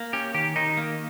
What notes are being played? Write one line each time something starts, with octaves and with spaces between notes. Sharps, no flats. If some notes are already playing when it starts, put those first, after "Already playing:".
Already playing: A#3
C#4 G4
D#3 G4
D#3 D#4
A#3